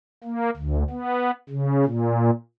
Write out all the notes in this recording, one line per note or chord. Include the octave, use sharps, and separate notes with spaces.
A#3
D2
B3
C#3
A#2